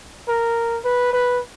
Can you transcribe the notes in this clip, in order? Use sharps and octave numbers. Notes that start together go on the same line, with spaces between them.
A#4
B4
B4